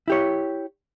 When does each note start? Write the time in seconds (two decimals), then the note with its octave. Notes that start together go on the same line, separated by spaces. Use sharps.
0.08 E4 G4 C#5